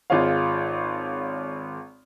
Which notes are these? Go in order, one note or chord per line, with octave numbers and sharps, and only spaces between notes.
G#1 F4 G#4 C#5 F5